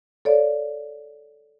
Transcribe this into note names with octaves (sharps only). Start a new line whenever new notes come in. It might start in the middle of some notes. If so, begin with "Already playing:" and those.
A4 C#5 D5 F5